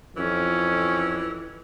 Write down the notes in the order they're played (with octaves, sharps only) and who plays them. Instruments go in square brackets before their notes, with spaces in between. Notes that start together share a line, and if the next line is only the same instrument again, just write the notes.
[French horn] F2 [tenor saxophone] E3 [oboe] C#4